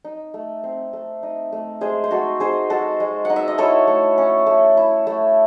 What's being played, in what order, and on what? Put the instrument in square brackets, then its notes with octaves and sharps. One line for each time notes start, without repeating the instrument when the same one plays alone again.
[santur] D#4
A3
C4
A3
D#4
A3
G#3 G#4 C5
C5
D#4 F#4 A4
D#4 G#4 C5
G#3 F#4 A4
G#3
D#4 F#5
E5
D#5
E4 A4 C#5
A3
C#4
A3
E4
A3